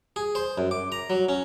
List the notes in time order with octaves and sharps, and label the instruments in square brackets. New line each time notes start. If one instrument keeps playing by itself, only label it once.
[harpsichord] G#4
C5
F#2
D6
A#5
F#3
C#4